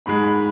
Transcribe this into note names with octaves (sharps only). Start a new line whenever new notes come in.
G#2 G#3 B5
B5